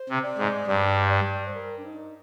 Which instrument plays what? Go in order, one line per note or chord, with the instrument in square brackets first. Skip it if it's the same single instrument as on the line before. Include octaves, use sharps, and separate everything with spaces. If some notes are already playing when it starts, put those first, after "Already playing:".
Already playing: [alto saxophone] C5
[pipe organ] C3
[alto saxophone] D5
[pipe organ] G#2
[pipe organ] G2 [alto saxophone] D5
[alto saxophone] D5
C5
A#4
D4
D#4